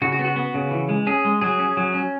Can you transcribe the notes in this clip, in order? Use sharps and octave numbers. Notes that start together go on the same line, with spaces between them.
C#3 F#4
F#4
B3
F#4
B3
C#3
E3
G#3
C#4 G#4
G#3
F#3 G#4
C#4
F#3
C#4